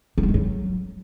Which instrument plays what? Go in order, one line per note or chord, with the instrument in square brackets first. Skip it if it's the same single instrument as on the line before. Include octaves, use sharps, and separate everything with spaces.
[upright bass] D3
G3
G#2
F#3